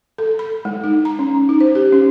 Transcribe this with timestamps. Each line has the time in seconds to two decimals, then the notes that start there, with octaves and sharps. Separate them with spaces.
0.18 A4
0.39 B5
0.65 G#3
0.84 D#4
1.05 A#5
1.19 C#4
1.49 D#4
1.61 C5
1.75 G4
1.92 C#4